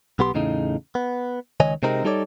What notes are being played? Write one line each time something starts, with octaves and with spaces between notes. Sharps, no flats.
B1 B3 G4 C6
E2 A2 C#3 D#4
B3
C#2 D#3 C#5 D#5 G#5
C3 G#3 C4 D#4 A#4
G3 D#4 A4 C#5 D5